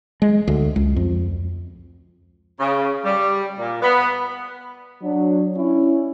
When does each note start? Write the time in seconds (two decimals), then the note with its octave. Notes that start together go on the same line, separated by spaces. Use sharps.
0.22 G#3
0.48 D2
0.76 C#2
0.96 F2
2.60 C#3
3.05 G3
3.59 A#2
3.82 B3
5.01 F#3 D4
5.56 C#4 E4